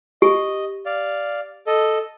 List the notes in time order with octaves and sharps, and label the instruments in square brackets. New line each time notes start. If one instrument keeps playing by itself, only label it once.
[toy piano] G4 [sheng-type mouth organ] D#5
[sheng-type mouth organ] D5 F5
A4 D#5